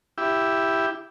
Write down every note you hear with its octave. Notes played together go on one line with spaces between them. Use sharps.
E4 G4